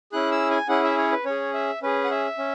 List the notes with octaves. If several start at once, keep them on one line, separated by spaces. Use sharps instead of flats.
C#4 E4 G#4 F#6
E6
G#5
C#4 E4 G#4 F#5
E5
C#5
B4
C#4 G#4 C#5
E5
C#4 G#4 B4
F#5
E5
C#4